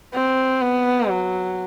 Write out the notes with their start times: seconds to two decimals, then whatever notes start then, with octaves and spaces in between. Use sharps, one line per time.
0.14 C4
0.61 B3
1.09 F#3